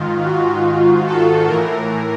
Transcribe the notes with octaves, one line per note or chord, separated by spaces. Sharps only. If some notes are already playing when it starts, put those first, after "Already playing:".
Already playing: G#2 D#3 F4
F#4
A4
A2 E3 A#4